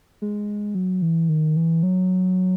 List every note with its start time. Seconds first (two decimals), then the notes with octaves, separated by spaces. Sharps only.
0.22 G#3
0.75 F#3
1.02 E3
1.29 D#3
1.56 E3
1.83 F#3